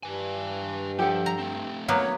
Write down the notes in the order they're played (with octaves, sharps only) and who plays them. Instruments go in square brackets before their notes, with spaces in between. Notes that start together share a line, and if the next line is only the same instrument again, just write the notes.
[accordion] G2 [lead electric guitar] B4 G#5
[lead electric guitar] F3 [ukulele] G4 A4 F#5
[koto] A#5
[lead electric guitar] A3 C4
[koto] F#3 A#3 B3 [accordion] C#5